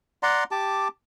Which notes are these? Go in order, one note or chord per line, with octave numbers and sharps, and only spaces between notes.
D5 F#5 A#5 C6
G4 A5 D6